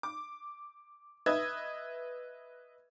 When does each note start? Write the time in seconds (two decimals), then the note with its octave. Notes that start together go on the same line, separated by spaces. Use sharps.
0.03 D6
1.26 B4 D#5 E5 D#6 E6 G#6